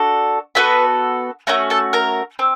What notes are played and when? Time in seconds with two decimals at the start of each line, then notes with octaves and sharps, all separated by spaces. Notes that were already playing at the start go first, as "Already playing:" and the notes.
Already playing: D4 F#4 A4
0.55 B3 D#4 F#4 A4 B4 B5
1.47 A3 C#4 F#4 A#4 A#5
1.70 A4 A5
1.93 A#4 A#5
2.39 C4